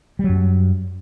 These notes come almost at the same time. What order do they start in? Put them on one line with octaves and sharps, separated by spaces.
G3 F#3 F#2